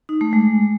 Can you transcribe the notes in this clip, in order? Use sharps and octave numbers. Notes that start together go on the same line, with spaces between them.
D#4
A3
G#3